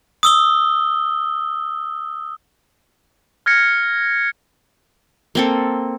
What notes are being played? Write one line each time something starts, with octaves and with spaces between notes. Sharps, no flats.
D#6 E6 G7
F6 G#6 A#6 C#7
A#3 C4 A4